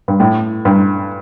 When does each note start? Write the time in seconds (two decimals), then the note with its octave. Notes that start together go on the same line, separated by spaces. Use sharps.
0.08 G2
0.20 A2
0.65 G2